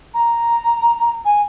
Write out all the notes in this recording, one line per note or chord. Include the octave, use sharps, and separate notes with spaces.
A#5
G#5